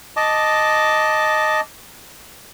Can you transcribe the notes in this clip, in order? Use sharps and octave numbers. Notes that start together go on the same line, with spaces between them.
D#5 A5 D6